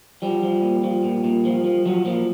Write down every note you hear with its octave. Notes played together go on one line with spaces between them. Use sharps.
F3 G3
F3
A#2
F3
A#2
A#2
F3
F3
F3 F#3
A#2 F3